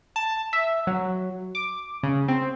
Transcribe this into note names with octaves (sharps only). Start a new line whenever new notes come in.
A5
E5
F#3
D6
C#3
C4